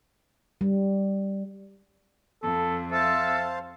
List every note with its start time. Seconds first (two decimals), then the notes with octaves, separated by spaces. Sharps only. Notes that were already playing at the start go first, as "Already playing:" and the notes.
0.61 G3
2.43 F2 A4
2.92 A4 C5 E5 F5 A5